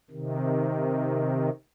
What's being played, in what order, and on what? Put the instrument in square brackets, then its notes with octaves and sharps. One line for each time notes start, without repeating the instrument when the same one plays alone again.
[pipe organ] C3 D#3